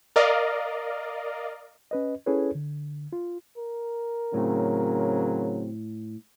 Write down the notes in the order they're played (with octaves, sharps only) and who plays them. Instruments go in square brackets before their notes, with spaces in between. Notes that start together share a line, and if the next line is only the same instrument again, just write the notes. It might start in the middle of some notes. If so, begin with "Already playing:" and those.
[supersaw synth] A#4 D5 D#5 F5
[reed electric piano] C#4 B4 D#5
C#4 E4 G#4 A4 B4 C#5
D3
F4
[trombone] A#4
[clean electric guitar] A2 [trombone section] C#3 F#3 C4